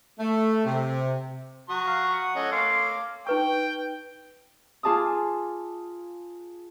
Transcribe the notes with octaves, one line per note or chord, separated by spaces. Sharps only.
A3
C3
F#4 A#5 C#6 D#6
F5
F#5
C#4 A4 C#5 D#5
F5 C6 D6
D#4 B4 G5 C#6
F4 G#4 A5 D6 D#6